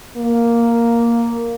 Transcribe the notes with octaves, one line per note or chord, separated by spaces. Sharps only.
A#3